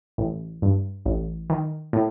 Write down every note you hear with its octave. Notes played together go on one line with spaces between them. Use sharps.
A1
G2
A1
D#3
A2